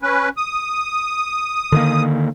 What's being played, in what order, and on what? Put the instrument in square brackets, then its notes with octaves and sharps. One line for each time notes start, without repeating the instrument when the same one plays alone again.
[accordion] C#4 B4
D#6
[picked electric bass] D3 D#3 A#3